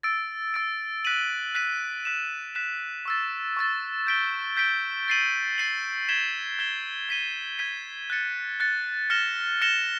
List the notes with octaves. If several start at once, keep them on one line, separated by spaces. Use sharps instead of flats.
E6 A6 D7
E6 A6 D7
F#6 B6 D#7 F#7
F#6 B6 D#7 F#7
F#6 B6 E7
F#6 B6 E7
C#6 E6 A6
C#6 E6 A6
G6 B6 D7 G7
G6 B6 D7 G7
A6 C7 D#7 F#7
A6 C7 D#7 F#7
G#6 B6 E7 G7
G#6 B6 E7 G7
G#6 B6 D#7 G7
G#6 B6 D#7 G7
F#6 A6 C#7
F#6 A6 C#7
F6 A#6 C#7 E7 G7
F6 A#6 C#7 E7 G7